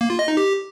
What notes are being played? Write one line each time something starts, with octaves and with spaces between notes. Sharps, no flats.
A#3
F4
D#5
D#4
G4